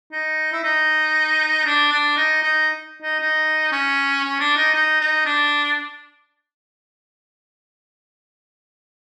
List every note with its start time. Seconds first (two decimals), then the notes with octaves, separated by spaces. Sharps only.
0.12 D#4
0.52 E4
0.63 D#4
1.66 D4
1.92 D4
2.17 D#4
2.42 D#4
3.02 D#4
3.20 D#4
3.72 C#4
4.23 C#4
4.39 D4
4.57 D#4
4.74 D#4
5.01 D#4
5.25 D4